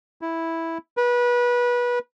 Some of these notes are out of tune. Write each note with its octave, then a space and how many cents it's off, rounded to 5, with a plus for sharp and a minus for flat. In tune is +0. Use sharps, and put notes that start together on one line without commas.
E4 -5
B4 -25